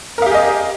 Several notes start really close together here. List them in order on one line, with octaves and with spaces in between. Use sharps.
A#4 F5 G4 G#4 D#5